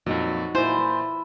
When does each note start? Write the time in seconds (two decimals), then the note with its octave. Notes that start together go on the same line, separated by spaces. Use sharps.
0.06 F2 A#2 F#3 D#4 F#4
0.55 A#2 E4 C5 G#5